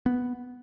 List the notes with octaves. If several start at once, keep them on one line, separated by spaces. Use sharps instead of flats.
B3